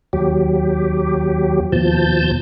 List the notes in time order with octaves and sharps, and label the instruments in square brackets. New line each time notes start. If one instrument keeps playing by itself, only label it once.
[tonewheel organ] D#2 F#3 G4
D#2 B2 F3 A5 G6